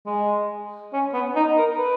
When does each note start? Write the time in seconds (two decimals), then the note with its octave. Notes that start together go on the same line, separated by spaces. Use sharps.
0.06 G#3
0.93 C#4
1.13 B3
1.36 D#4
1.58 A#4
1.78 B4